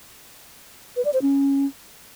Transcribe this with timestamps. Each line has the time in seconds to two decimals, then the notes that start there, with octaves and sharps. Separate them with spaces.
0.96 B4
1.05 D5
1.14 C5
1.22 C#4